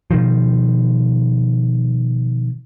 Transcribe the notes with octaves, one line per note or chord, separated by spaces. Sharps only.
B2 D#3 F3